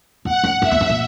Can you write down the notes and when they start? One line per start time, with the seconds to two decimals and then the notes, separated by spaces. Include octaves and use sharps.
0.25 E2 F#5
0.44 F#2
0.62 F#2 E5
0.71 E2
0.81 F#2
0.90 A#2